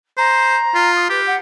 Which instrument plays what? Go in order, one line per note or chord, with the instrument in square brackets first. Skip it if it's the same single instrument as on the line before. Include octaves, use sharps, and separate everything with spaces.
[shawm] C5 [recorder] A#5
[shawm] F4
[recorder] D#6
[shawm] G4 [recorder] B4
[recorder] F#5